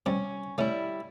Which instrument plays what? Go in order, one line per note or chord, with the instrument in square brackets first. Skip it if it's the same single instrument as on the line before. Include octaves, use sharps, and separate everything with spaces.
[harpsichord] C3 G3 [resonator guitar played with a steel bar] C#4
[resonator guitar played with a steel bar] G3 E4 [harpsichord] A3 C#4